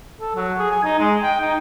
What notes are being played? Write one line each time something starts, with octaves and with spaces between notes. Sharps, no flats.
A4
F#3
G#4
G#5
D#4
G#3
G5
D#4